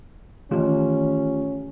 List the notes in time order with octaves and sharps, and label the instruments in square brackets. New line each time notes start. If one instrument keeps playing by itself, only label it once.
[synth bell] D#3 E3 [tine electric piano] A3 F4 G4 [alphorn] C#4